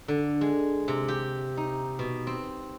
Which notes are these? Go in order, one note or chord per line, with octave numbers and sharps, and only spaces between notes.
D3
G#3
C3
G4
D#4
B2
C4